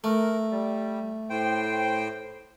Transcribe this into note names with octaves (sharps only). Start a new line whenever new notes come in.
A3 A#4
G3
A2 C5 G5